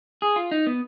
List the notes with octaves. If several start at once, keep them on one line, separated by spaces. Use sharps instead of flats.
G#4
F4
D#4
B3